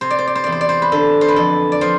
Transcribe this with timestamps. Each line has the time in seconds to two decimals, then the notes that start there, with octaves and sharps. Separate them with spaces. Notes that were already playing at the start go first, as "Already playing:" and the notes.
0.01 C3 C5
0.10 D5
0.19 C5
0.27 D5
0.35 C5
0.44 E2 D5
0.52 C5
0.61 D5
0.69 C5
0.82 B4
0.92 D3 A4
1.21 C5
1.28 B4
1.36 F2 A4
1.72 D5
1.81 F3 C5